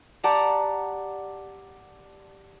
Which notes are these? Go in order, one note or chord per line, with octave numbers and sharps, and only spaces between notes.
G4 D5 F#5 A5 A#5